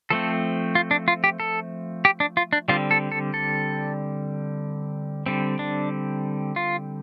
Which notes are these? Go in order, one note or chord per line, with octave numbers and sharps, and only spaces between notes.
F3 A3 C4 A4
F4
D4
F4
G4
A4
G4
D4
F4
D4
D3 G3 C4 F4
A4
A4
A4
D3 G3 C4
D4
F4